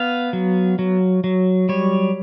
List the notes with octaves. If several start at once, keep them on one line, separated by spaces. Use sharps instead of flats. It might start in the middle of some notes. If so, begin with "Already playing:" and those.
Already playing: B3 F5
F#3
F#3
F#3
G3 C#5